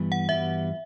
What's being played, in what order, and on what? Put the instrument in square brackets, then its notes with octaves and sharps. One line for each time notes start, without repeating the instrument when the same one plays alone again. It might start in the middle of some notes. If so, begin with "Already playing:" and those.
Already playing: [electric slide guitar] G2 E3 G3 B3
[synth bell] F#5
[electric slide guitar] G2 E3 G3 B3 F#4 [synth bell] E5